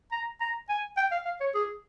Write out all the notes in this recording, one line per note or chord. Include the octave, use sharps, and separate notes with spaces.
A#5
A#5
G#5
G5
F5
F5
C#5
G#4